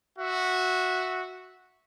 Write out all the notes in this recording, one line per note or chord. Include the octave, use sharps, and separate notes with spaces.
F#4 E5